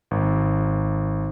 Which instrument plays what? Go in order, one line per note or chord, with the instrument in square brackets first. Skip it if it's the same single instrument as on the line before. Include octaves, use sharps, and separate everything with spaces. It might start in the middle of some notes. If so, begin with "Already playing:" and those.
[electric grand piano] G#1